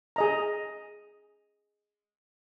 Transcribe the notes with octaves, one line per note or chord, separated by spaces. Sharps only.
G#4 D#5 A#5